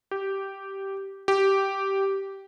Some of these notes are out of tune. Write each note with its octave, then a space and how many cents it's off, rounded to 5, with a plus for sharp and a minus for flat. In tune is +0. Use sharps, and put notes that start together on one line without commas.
G4 -10
G4 -10